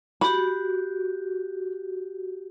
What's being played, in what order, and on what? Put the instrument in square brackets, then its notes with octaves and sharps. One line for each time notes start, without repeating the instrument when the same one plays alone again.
[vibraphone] F#4 G4 [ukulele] B5